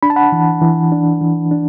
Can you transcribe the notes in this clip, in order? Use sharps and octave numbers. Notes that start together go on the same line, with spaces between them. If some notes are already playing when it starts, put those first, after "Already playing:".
D4 B5
A5
F#5 B5
E3
E3
D4
E3
D4